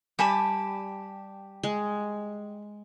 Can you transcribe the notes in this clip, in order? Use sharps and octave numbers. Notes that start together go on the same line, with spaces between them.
G3 G4 G#5 A5 B5
G#3